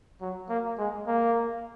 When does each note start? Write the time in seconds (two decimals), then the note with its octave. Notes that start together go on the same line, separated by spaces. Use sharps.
0.21 F#3
0.50 A#3
0.79 G#3
1.07 A#3